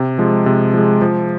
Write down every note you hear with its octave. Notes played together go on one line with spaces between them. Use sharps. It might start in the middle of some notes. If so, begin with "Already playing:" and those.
Already playing: C3
F3 G#3
C3
F3 G#3
F3